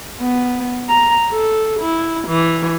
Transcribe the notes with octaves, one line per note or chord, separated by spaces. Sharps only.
B3
A#5
A4
E4
E3